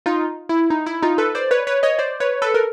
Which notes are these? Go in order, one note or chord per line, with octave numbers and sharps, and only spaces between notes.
D#4 F4
E4
D#4
E4
D#4 F4
A4 B4
C5 D5
B4 C#5
B4 C#5
C#5 D#5
C5 D5
B4 C#5
A4 B4
A#4